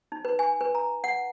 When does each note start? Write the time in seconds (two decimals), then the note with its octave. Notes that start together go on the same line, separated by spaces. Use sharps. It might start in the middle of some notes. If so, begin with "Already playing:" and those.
0.12 D#4
0.25 B4
0.39 G#5
0.61 B4
0.75 A#5
1.04 F#5